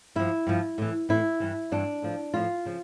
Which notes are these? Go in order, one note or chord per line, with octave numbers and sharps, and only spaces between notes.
G2 F3 E4
G2 F3
A2 E3
A2 E3 E4
G2 E3
G2 E3 D4
A2 F3
A2 F3 F4
C#3 F3